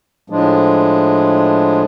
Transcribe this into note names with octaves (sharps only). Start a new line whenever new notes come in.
A2 F3 G#3 D4